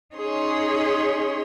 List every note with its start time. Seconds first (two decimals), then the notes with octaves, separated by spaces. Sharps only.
0.15 C#4 D#4 G#4 C#5 C6